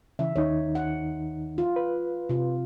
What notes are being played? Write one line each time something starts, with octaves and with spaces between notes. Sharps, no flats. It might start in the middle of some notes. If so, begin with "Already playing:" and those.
C#3 E3 E5
D#2 D#3 D#4 C#5
F#5
F4
B4
C3 F4